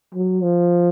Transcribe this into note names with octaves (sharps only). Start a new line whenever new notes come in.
F#3
F3